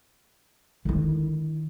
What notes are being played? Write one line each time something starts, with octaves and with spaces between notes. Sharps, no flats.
D3 D#3 E4